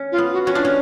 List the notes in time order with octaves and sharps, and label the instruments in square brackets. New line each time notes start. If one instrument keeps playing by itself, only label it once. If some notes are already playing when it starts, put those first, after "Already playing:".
Already playing: [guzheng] C#4
[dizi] F4
[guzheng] B3
[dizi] F#4
[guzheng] C#4 [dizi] F#4
[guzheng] D4 [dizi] F4
[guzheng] C#4